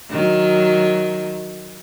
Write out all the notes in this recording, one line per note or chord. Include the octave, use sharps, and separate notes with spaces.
D#3 F#3